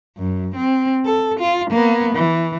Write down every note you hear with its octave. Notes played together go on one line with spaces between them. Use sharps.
F#2
C4
A4
F4
A#3 B3
E3